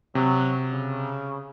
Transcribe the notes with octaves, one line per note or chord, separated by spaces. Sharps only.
C3 F#3
C#3